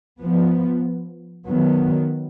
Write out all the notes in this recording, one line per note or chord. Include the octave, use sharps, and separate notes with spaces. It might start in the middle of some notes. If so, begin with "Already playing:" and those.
F3 B3
D#3 F#3 B3